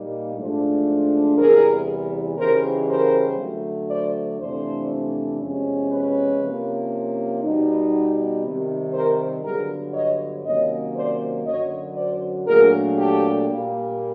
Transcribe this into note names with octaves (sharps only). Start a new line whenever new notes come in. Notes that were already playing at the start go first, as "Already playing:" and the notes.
Already playing: A#2 G3 A#3 D#4
G#2 F3 A3 D4
E2 C3 E3 G3 B3 G#4 A#4
C#3 E3 G3 B3 D#4 A#4 C5
A#4 C5
D3 F#3 A3
C5 D5
F2 C3 E3 A3 D4 C5 D5
E2 C3 F3 G#3 C#4
B4 C#5
C3 F3 A#3 C#4
B2 G3 B3 D#4
C3 D#3 G3
A#4 C5
G2 D3 F#3 B3 G#4 A#4
C#5 D#5
C3 D#3 F#3 A#3 C#4 C#5 D#5
C5 D5
F#2 D3 F#3 C#5 D#5
C5 D5
A#2 F#3 A3 D4 G#4 A#4
G4 A4
A#2 G3 A#3